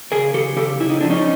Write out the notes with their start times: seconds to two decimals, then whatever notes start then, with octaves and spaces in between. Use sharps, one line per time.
0.12 C#3 G#4 A#4
0.34 C#3 G4 A4
0.56 C#3 G4 A4
0.80 C#3 E4
0.90 D#4
1.01 F3 D4
1.10 C#4 D#4